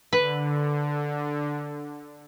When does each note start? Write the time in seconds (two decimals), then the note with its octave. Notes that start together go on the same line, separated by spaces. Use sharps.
0.13 D3 B4